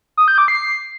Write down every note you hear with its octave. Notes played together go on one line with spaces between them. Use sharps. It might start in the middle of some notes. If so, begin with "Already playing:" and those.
D#6
G6
D6
C7